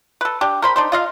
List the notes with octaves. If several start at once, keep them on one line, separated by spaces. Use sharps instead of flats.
A4 B4
D4 G4
A#4 C5 B5
D4 D#4 C5
F4 D#5 F5